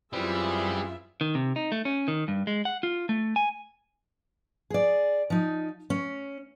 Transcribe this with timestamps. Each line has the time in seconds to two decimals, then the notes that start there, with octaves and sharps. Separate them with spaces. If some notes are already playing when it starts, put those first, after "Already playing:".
0.13 F#2 E3 G3 C4 F4 G#4 E5
1.21 D#3
1.35 C3
1.56 D#4
1.72 A3
1.85 C#4
2.08 D#3
2.28 G2
2.47 G#3
2.65 F#5
2.83 F4
3.09 A3
3.36 G#5
4.70 G#4 D5
5.30 F3 D#4
5.90 C#4